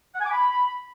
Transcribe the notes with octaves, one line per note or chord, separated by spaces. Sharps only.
F#5
G#5
D6
B5